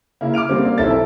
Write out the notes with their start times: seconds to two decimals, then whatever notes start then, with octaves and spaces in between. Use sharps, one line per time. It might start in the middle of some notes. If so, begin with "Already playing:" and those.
0.21 C#3 A#3 E4
0.33 D6 F6 D7 F7
0.49 D3 G3 A#3 C4 C#4
0.63 A#3 D5
0.78 B1 C4 E4 A4 E5 A6
0.91 A5